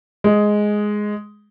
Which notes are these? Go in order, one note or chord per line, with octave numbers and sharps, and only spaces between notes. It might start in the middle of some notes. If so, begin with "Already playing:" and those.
G#3